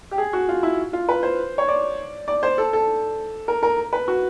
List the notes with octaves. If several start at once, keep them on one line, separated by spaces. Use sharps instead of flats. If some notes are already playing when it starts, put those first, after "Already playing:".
G4
G#4
F#4
F4
E4
F4
B4
C5
C#5
D5
D5
C5
A4
A4
A#4
A#4
B4
F#4